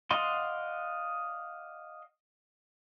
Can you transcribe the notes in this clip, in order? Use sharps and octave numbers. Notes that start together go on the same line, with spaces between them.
D5 D#5 F5 F#5 C6